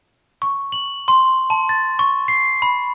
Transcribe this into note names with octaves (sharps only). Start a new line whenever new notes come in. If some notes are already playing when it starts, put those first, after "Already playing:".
C#6
F#7
C6
A5
A6
C#6
C7
B5